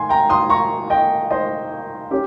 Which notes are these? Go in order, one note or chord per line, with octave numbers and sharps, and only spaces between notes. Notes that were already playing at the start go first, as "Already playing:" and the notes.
Already playing: G#2 D#3 G#5 C6
G5 A#5
C6 D#6
A#5 C#6
D#5 G5
C5 D#5
C#4 G4